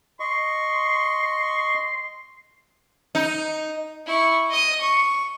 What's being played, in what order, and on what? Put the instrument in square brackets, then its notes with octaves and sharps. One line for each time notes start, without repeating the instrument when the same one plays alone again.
[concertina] D#5 C#6 [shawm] C6
[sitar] D#4
[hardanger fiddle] E4 C#6
D#5 D#6
C#6